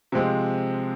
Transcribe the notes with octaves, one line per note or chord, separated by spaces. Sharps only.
C3 F3 G#3 C4